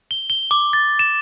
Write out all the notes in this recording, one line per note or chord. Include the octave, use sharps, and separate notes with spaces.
G7
G7
D6
A6
E7